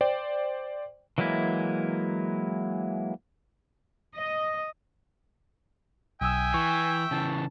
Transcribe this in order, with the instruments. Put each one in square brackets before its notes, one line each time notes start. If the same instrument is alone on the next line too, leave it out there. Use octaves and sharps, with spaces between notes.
[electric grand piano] C5 D5 G5
[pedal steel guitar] E3 F#3 G#3 A#3 E4
[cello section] D#5
[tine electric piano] B1 D#6 E6 [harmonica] E5 G5 [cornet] G#5
[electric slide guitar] E3 [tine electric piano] C#6
[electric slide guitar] C#3 E3 [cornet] A5